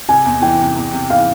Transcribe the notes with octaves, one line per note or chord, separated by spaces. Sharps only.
C3 G#5
E2
E3 G5
C3
E2
C3
E3 F5